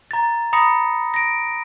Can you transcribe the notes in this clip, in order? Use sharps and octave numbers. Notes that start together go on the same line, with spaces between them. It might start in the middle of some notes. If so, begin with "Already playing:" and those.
A#5 A6
A#5 B5 D#6 A#6 C#7
A#6 D7